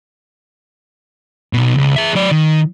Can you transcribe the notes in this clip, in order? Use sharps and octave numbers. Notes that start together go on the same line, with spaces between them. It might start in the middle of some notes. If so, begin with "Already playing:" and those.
B1 B2
C#2
G#4 E5
F#3 D5
D#3